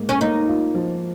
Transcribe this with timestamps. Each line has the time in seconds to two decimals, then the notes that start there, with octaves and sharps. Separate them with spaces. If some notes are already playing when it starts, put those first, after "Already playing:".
Already playing: G#2 A#3
0.09 C#4
0.21 A#3 D#4
0.48 F4
0.75 F3